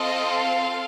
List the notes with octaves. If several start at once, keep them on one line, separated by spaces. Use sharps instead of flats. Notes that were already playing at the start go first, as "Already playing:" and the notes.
Already playing: C4 F4 A4 D#5
F5